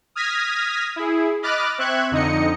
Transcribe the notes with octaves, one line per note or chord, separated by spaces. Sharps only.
D#6 F6 G#6 A#6 B6
E4 G#4
D#5 B5 D6 F6 F#6 A6
C4 E5 C#6 F#6 G#6
F2 D3 D#4 D#5 C#7